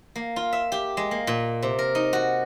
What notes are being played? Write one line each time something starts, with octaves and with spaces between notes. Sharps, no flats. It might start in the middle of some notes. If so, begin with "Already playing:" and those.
A#3
F4
E5
G4
G#3
A#3
A#2
C3
A#4
D#4
F#4